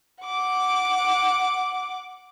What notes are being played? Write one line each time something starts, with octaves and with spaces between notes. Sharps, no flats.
F#5 D6